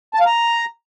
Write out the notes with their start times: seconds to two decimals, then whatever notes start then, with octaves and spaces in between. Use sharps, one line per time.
0.14 A5
0.20 F5
0.26 A#5